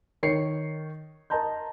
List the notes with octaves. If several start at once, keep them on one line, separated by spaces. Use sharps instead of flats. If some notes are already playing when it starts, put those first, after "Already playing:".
D#3 C#5 C7 C#7
A#4 D#5 A5 A#5 C6 G6